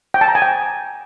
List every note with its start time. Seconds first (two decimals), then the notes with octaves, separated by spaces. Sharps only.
0.14 G5
0.21 A5
0.28 A#5
0.35 G#5
0.42 G5